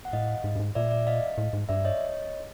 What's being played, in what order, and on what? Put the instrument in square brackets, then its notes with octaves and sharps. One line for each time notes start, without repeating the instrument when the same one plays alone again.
[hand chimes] F#5
[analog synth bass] A2 [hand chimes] D#5 F5
[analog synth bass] G#2
G2
G#2
[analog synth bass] A#2 [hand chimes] D5 E5
[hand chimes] D5 E5
D#5 F5
[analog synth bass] A2
G#2
[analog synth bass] G2 [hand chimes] D5 E5
[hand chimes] C#5 D#5